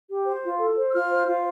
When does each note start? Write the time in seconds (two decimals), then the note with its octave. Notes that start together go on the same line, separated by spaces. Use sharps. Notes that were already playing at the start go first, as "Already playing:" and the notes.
0.10 G4
0.26 C5
0.43 F4
0.59 A4
0.77 C5
0.88 E6
0.93 F4 F6
1.11 C5
1.27 F4